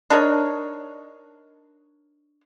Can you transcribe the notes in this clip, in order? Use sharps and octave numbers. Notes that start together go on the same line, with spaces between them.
D4 D#4 A#4 C#5